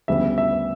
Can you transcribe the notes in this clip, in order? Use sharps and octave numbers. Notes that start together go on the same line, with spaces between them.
D2 C#3 G3 B3 E5
E5